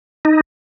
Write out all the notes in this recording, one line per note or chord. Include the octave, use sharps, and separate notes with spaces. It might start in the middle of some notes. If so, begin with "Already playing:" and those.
D#4